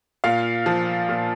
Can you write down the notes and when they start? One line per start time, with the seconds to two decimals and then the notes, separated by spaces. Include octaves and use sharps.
0.24 A#2 F5
0.66 F3
1.09 A#2